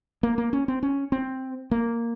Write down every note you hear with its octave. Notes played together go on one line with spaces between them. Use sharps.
A#3
A#3
C#4
C4
C#4
C4
A#3